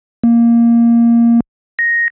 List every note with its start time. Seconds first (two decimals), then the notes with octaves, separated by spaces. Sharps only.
0.24 A#3
1.79 A#6